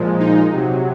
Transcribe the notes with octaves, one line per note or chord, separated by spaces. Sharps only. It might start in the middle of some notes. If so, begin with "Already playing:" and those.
Already playing: A#2 F3 G#3
D#4
C3 F#3